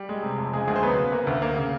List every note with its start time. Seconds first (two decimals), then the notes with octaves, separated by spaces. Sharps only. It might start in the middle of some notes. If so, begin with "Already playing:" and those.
Already playing: G3
0.09 G#3
0.23 C3
0.38 F2
0.53 C#3 G#3 G#4
0.68 D2 G#3 G#4
0.76 C5
0.83 F#3 B3 B4
0.98 C#3
1.12 A#3
1.27 D2
1.42 A#3
1.57 C#3